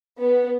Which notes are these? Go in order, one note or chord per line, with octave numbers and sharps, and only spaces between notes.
B3